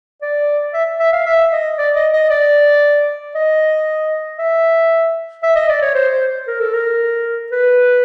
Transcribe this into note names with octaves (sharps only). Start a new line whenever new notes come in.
D5
E5
E5
F5
E5
D#5
D5
D#5
D#5
D5
D#5
E5
E5
D#5
D5
C#5
C5
C5
A#4
A4
A#4
B4